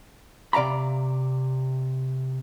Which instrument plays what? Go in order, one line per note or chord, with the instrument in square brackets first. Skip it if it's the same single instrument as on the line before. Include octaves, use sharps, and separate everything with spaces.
[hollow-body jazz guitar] C3 D5 F5 A#5 B5